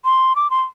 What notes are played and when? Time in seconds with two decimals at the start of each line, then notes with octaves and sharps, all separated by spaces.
0.05 C6
0.36 D6
0.50 C6